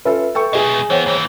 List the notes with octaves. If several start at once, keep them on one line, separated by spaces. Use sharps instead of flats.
C#4 F4 A4 B4 E5
A4 G5 C#6
B2 G#3 G#4 D#5
E3 B3 C5 C#5 G5
D#2 E3